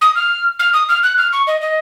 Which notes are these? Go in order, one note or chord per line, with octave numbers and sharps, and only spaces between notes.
D#6
F6
F6
D#6
F6
F#6
F6
C#6
D#5
D#5